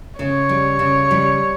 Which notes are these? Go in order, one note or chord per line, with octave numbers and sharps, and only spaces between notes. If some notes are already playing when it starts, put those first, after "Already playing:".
C#3 C#5
G3
C#3
G3